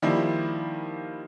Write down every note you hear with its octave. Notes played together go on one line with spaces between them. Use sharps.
D#3 F3 G3 A#3 E4